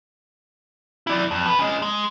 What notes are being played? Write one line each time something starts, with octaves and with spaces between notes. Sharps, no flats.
E4 D5
F2
F#4 B4
C#4 D#5
G#3